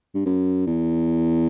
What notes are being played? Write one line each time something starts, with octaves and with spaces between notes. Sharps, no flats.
G2
F#2
E2